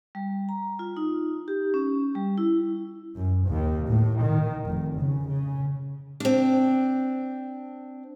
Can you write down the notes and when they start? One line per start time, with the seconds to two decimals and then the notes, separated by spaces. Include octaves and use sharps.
0.15 G3
0.49 A#5
0.79 F4
0.97 D#4
1.48 G4
1.74 C#4
2.15 G3
2.38 E4
3.16 F#2
3.47 D#2
3.89 A2
4.21 D#3
4.65 F1
4.98 C#3
5.27 C#3
6.20 C4 D4